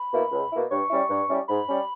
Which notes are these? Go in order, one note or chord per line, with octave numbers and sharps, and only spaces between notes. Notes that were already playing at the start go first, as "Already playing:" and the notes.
Already playing: B5
B2 A#3 E4
C#2
B2 A#3 E4
G2 C#6
G3 C#4 E4
G2
G3 C#4 E4
G#2 B5
G3 C#4